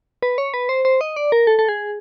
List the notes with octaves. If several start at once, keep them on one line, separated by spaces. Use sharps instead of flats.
B4
C#5
B4
C5
C5
D#5
D5
A#4
A4
A4
G#4